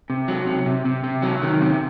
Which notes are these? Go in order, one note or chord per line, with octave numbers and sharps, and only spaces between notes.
C3
F#3
C3
C3
C3
C3
F#3
D#3
C3